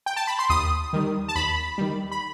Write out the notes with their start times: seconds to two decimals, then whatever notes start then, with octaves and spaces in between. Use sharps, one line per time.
0.06 G5
0.16 A5
0.27 B5
0.39 C6
0.49 D#2 D#6
0.93 D#3 G3
1.28 A5
1.35 D#2 B5
1.78 D#3 G3
2.11 B5